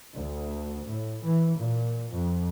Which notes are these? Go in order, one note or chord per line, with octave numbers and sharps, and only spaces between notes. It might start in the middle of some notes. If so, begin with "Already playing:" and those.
D2
A2
E3
A#2
F2